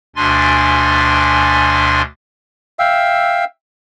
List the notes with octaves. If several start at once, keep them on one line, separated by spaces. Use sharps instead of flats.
D2 B2 D4 G#5 C6 A6
E5 F5 G5 E6